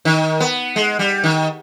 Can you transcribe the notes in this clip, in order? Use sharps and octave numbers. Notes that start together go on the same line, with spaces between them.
D#3
B3
G#3
G3
D#3